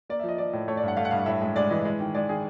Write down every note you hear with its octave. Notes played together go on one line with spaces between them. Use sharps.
A#3 D5
F3 E5
D#5
F3 D5
A2
A3 C#5
D5
G2 F#5
A3 F5
F#5
G2 F5
A2 E5
G#3
G#3 D5
E3 D#5
G#3
D#3
G#3 D5
D#3 G#4